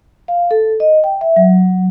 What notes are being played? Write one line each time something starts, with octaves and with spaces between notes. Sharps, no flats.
F5
A4
D#5
G5
E5
F#3